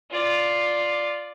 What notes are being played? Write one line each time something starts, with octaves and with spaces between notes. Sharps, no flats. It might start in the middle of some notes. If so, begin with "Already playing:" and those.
F4 D5